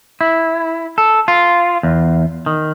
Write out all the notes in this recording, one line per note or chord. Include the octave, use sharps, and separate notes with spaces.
E4
A4
F4
E2
D#3